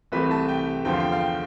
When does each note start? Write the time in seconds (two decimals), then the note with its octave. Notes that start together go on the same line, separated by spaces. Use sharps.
0.12 C2 C3 E3 A3 B4
0.31 A5
0.49 G5
0.85 E2 D3 F3 G5
0.93 F5
1.00 G5
1.12 F5
1.20 G5